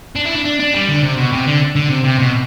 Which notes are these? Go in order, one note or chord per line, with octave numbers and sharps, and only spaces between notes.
D4
E4
D4
D4
D4
G3
D3
C3
B2
C3
D3
D3
C3
C3
B2